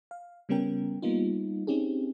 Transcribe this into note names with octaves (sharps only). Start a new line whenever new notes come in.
F5
C#3 G3 B3 C#4 A#4 G5
G3 A#3 B3 D#4 F4
C4 C#4 D#4 G4 G#4